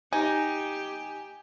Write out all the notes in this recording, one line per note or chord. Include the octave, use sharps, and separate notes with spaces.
D#4 G4 G#5